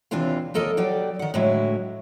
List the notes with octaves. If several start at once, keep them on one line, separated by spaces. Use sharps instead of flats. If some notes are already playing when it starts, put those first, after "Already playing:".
D#2 C3 E3 D4 F4 F5
D#2 A#3 A4 A#4 D#5
F#3 G3 D5 G5
D#3 F#5
A2 D3 F#3 G#3 E4